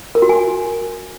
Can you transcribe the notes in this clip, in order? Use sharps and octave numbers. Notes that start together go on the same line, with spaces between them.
A#4
F#4
G#5